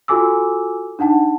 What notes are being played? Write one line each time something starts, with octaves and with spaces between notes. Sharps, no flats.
F4 F#4 A4 G#5 D6 E6
D4 D#4 F#5 A5